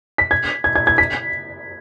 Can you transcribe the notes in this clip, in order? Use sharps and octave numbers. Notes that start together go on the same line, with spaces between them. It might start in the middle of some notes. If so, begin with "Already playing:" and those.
B6
G#6
G#6
G#6
G#6
B6